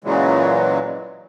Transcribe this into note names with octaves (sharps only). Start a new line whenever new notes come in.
A#2 C#3 E3 F#3 G#3